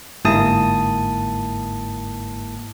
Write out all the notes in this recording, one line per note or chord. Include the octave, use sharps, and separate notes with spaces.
G1 G#2 A#3 E4 A5 D#6